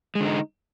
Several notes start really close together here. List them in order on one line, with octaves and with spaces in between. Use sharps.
G#3 D3 D#4